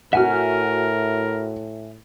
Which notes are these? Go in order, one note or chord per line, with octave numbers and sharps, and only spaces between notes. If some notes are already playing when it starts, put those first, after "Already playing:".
A2 F#4 A#4 E5 F#5 G#5 F6